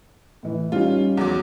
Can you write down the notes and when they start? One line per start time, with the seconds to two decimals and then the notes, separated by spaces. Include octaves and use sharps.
0.43 A2 E3
0.72 G3 C#4 D#4 F4
1.17 E2 F#3 D6